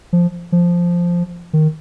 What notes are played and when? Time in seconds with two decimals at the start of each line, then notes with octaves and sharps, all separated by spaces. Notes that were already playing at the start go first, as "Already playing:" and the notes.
0.13 F3
0.52 F3
1.53 D#3